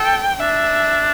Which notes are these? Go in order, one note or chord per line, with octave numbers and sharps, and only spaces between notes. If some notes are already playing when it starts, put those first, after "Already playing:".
Already playing: A4 G5
D4 E5